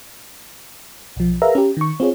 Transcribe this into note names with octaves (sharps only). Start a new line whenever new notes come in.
B1 F3
G#4 A#4 B4 E5 F5 A#5
C#4 G4
D#3 C#6
C4 F4 G#4 C#5